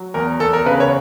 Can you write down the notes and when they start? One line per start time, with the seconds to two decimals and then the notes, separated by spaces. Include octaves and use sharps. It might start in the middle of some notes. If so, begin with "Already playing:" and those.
Already playing: F#3
0.14 E2 A#4
0.40 E2 A4
0.53 A#4
0.66 C#3 B4
0.80 C#5